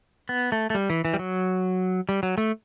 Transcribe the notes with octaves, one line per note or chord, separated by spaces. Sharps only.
B3
A3
A3
G3
E3
E3
G3
F#3
G3
F#3
A3